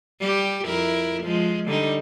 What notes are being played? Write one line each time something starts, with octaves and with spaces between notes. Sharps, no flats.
G3 G4
F2 E4 A#4
F3 G#3
D3 G3 D#4